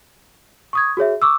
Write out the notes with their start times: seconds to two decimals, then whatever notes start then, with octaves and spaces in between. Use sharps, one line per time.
0.73 C#6 D#6 G#6
0.97 F#4 G#4 C#5 E5
1.22 C#6 D6 E6